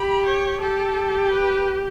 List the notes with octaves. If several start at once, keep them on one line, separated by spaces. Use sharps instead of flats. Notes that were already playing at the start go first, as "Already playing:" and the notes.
Already playing: G4 B5
C#5
G4 A4
B4